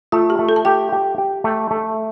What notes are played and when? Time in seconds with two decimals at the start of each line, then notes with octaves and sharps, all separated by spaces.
0.12 A3 F4
0.30 G4
0.39 A3
0.49 A4
0.56 A5
0.65 G4 G5
0.92 G4
1.18 G4
1.44 A3
1.71 A3